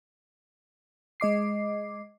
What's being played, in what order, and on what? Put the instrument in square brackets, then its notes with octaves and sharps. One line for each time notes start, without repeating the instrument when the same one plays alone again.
[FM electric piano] G#3 D#5 D6 C7